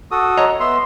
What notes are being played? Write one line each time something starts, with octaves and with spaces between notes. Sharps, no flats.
F#4 A4 D#6
C#5 D#5 A#5
B3 E5 C6